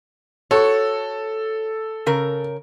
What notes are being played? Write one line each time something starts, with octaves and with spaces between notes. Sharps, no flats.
F#4 A4 C#5
C#3 A#4